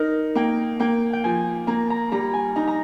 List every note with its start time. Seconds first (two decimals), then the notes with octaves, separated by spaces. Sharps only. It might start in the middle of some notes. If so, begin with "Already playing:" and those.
Already playing: D#4 A#4
0.35 A#3 G5
0.80 A#3 G5
1.13 G5
1.24 F3 G#5
1.67 A#3 A#5
1.90 A#5
2.12 G3 A#5
2.33 G#5
2.56 D#4 A#5
2.67 A#5